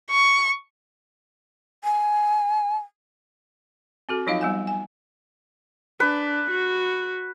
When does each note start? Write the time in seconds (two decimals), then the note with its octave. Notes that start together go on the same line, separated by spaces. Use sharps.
0.11 C#6
1.84 G#5
4.09 C4 F#4 A4
4.27 F3 F#3 D#4 F4 D#5 F5
4.41 G3 B3 G#5
4.67 G#5
6.00 D4 B4
6.51 F#4